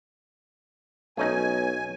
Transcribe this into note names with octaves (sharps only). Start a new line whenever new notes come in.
B1 A3 C#4 D#4 G#5